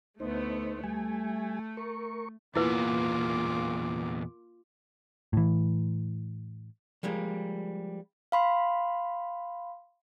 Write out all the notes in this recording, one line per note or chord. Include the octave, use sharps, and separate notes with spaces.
D2 A3 B3 D#4 C5
G3 A3 G#5
A#4 C#6
E2 A#2 A#3 B3 E4 F4 B4 D6
A2 E3
F3 G3 G#3 A#3
F5 B5 C6